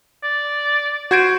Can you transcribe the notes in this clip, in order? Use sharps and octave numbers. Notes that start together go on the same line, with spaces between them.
D5
F#4 C5 G#6 D7